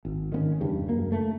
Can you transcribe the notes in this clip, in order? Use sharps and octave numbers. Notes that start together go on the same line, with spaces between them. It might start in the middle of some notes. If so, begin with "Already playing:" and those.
G#1
D#3 B3 C#4
E2 G2 C#3
F#2 A#3
A3